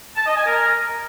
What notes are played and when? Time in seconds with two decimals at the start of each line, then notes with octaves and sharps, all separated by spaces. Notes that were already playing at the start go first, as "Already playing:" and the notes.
0.17 A5
0.26 D#5
0.36 G#5
0.46 A#4